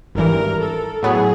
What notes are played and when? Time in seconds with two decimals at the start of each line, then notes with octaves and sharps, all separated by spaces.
0.15 G#1 G2 E3 A#4
0.60 A4
1.03 A2 F#3 B3 G#4